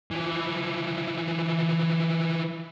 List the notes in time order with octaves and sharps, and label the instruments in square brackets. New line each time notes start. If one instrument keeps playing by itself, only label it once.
[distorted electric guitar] E3 F3